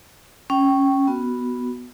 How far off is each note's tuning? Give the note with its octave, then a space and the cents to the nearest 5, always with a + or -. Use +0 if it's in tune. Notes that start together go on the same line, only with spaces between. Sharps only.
C#4 -5 G5 -15
B3 +0 F#4 +5